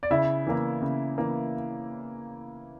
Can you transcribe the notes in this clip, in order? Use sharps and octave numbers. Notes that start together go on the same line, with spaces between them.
D5
C#3 E4 E5
E3 A#3
C#3
E3 A#3